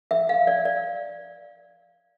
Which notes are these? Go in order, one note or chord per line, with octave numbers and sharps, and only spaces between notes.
E5
F5
D5
D5